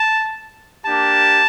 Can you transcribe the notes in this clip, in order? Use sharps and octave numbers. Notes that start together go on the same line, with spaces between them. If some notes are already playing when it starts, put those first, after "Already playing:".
Already playing: A5
A#3 D4 G4 A5